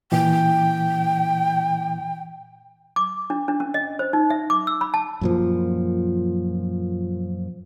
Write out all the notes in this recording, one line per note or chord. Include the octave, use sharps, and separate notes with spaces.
A#2 E3 G5
D6
D4
D4
C#4
D#5
C5
D#4
E5
D6
E6
B5
A5
F#2 A#2 F3